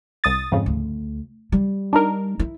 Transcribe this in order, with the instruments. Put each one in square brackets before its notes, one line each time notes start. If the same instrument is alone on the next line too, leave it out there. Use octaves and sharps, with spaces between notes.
[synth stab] C2 D#6 A6
F2 G#2 C#3
[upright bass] D2
G3
[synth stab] D4 D#4 A#4
[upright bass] E4